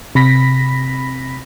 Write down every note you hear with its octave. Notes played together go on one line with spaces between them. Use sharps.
C3 B5 A#6 B6